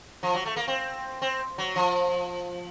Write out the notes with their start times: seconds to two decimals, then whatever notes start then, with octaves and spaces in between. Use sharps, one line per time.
0.23 F3
0.34 F#3
0.45 A3
0.56 A#3
0.68 C4
1.22 C4
1.58 F#3
1.76 F3